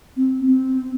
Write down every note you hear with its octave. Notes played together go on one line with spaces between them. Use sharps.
C4
C4